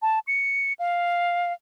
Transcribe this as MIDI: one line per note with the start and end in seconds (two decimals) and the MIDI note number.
0.02 0.19 81
0.27 0.73 97
0.79 1.53 77